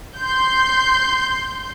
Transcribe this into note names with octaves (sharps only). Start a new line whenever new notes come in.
C6 G6